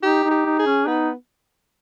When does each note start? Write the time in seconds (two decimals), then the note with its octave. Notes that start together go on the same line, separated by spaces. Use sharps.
0.03 D#4 G4
0.24 D#4
0.31 G4
0.45 D#4
0.59 G#4
0.66 C#4
0.87 B3 D#4